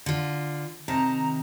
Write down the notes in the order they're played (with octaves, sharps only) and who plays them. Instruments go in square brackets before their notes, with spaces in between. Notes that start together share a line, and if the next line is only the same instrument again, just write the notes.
[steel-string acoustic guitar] D3 F4
[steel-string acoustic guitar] C3 D#3 A5 [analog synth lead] A#5